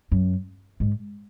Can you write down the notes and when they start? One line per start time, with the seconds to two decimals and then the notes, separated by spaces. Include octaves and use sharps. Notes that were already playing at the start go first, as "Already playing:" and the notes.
0.12 F#2
0.80 G#2